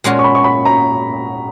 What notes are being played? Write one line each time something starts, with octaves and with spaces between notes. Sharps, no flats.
A#2 G#3 C#4 F#4
C#6
B5
C#6
B5
A#5